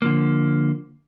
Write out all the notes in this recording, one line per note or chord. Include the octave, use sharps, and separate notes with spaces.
D3 F3 A#3